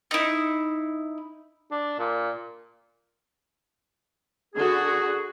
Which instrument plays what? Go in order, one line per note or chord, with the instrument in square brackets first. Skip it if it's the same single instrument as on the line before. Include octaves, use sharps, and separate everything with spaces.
[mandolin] D#4 E4
[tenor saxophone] D4
A#2
[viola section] D3 F#4 [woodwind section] G#4